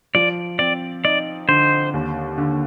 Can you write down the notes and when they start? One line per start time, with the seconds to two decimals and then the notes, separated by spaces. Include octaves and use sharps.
0.15 F3 D5
0.59 C4 D5
1.04 D#4 D5
1.48 D3 C5
1.94 D#2
2.38 D3